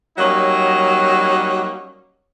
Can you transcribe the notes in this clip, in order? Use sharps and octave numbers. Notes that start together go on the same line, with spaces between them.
F#3 G3 A#3 C#4 D#4